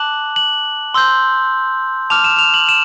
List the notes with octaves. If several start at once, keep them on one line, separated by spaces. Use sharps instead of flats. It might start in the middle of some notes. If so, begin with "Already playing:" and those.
Already playing: A5 D6 F#6 F#7
F#7
C6 E6 G6
A5 D6 F6 F7
E7
F7
F#7
E7